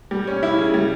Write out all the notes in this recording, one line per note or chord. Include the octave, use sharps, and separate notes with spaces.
G3
C#4
E4
C#3
G3